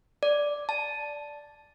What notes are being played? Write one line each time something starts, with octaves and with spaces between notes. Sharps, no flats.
D5
A5